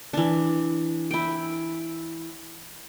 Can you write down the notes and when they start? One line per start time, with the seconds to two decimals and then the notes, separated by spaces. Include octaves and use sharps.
0.13 E3 D4
1.11 E4 G5